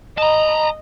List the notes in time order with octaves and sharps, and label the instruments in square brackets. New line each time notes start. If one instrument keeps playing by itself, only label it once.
[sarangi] D#5 [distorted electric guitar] A5 A#5